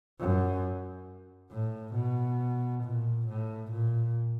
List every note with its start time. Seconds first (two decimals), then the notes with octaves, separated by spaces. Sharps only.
0.20 F#2
1.52 A2
1.95 B2
2.84 A#2
3.28 A2
3.72 A#2